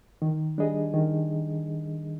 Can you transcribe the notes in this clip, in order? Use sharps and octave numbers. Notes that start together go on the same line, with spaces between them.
D#3
G3 D4 G#4 D#5
D#3